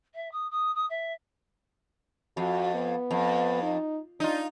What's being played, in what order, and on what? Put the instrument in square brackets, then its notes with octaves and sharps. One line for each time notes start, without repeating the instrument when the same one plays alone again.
[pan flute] E5
D#6
D#6
D#6
E5
[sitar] F2 [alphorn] F#4
[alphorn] B3
[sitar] F2
[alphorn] D#4
[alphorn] D4 [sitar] D#4 F4